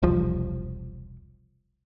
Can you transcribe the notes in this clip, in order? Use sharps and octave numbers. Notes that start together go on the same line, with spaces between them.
E1 C2 F3